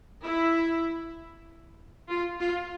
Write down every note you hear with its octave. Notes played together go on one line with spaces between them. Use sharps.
E4
F4
F4